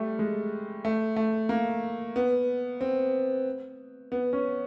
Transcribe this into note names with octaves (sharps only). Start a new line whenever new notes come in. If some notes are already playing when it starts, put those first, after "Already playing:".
Already playing: G3 A3
G#3
A3
A3
A#3
B3
C4
B3
C#4